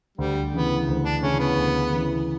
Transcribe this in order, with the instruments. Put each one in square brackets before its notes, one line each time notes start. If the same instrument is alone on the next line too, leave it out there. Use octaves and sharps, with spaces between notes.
[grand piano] D2 [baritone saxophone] G3
[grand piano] C#3 E3 [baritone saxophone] B3
[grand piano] D2
[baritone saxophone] D4
[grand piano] C#3 E3 [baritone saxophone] C#4
[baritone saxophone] B3
[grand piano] D2
C#3 E3